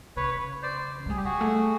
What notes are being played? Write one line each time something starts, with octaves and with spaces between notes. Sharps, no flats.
C#3 B4 C#5
C5 D5
G#3
G3 G#4
G4
F#4 G#4
A3